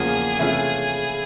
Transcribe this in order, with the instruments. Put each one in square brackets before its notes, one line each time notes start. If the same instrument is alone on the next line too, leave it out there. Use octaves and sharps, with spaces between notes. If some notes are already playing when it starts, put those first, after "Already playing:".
Already playing: [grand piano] E2 C#3 F3 A#3 [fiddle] G#4
[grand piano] C3 E3 A3 C#4 F4